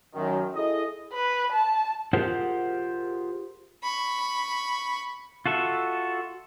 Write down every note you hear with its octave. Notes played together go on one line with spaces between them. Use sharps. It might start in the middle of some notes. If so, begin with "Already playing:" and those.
F#2 D#3
E4 G#4 A4 D#5
B4
A5
F4 G4 G#4 A#4 C5 F#5
B5 C#6
F4 F#4 A4 E5